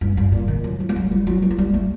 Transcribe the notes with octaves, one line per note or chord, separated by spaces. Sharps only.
G2
G2
A#2
D#3
F#3
F#3
G3
F#3
G3
F#3
G3
F#3
G3
A3